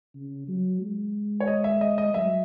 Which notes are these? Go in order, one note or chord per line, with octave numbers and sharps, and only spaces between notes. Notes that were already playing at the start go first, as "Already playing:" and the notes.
C#3
F#3
G#3
C#5
D#5
E5
D#5
D#5
F#3 E5